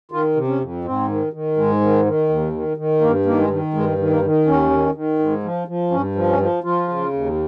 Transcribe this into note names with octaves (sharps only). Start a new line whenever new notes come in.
D#3 F4
C3
C#4
F2
G#2 C4
D#3
D#3
G#2 G#3
D#3
D#3
D#2
D#3
D#3
G2 A#3
D#3 A#3
G#3
D#3
G2 G#3
D#3
A#3
D#3
D#2 C#4
D#3
D#3
G#2
F3
F3
G2 C#4
F3
C#4
F3
F3 F4
C#3
D#2